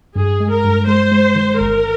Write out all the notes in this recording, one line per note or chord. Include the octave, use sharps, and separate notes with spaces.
G2 G#4
G#3
A#4
G2
G#3 C5
G#3
D#3
G1 A#4